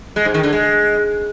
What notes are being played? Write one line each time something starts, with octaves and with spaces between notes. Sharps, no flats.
G#3
G#2
D#3
D3
G#3